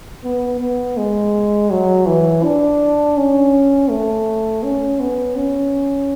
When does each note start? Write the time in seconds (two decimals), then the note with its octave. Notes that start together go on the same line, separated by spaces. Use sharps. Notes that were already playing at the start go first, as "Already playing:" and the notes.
0.24 B3
0.60 B3
0.97 G#3
1.70 F#3
2.06 E3
2.43 D4
3.17 C#4
3.90 A3
4.63 C#4
5.00 B3
5.36 C#4